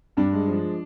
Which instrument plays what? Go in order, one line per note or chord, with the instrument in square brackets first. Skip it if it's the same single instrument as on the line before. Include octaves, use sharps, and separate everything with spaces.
[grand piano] G2 D4
G#3
F3